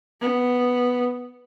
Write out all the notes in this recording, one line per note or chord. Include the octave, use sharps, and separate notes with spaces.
B3